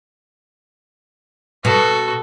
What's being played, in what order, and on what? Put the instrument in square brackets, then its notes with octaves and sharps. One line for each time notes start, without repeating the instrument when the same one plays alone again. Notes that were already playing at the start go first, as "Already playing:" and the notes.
[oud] B2 [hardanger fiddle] F#4 A4